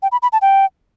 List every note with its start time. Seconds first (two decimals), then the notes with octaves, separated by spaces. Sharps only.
0.02 G5
0.12 B5
0.22 B5
0.33 A5
0.42 G5